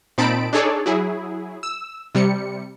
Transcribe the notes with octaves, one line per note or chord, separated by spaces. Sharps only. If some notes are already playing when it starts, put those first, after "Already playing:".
A#2 C4 D#4 A5 B5 D7
D4 D#4 G#4 A4 C#5 D5
F#3 E4 G#4
E6
C3 G3 C#7